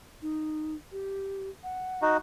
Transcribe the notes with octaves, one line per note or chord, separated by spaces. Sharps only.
D#4
G4
F#5
D#4 F#4